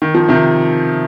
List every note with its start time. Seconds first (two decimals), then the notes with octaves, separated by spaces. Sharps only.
0.02 D#3
0.15 F3
0.28 C3 D#3